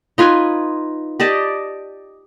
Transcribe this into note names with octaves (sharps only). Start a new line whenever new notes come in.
D#4 F4 B4 G#5
G4 D5 D#5 A5